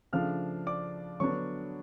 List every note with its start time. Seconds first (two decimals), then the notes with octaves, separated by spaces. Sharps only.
0.13 C#3 F3 A3 D4 F5 F6
0.67 D5 D6
1.20 D3 F#3 B3 D4 C#5 C#6